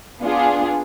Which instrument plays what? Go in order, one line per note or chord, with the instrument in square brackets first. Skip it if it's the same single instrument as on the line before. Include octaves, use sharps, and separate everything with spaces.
[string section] B3 D4 F4 G#4